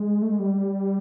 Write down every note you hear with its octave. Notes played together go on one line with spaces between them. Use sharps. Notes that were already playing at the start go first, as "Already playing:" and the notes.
Already playing: G#3
A3
G#3
G3